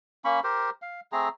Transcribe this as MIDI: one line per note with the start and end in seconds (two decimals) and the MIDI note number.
0.25 0.40 58
0.25 0.40 61
0.25 0.40 83
0.25 0.40 85
0.44 0.70 67
0.44 0.70 70
0.44 0.70 72
0.82 1.00 77
1.12 1.29 57
1.12 1.29 60
1.12 1.29 68
1.12 1.29 82